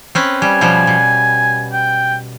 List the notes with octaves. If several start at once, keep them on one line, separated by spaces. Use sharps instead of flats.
C4 C#4 B4
G3 G#5
B2 F3 G3
B2
G5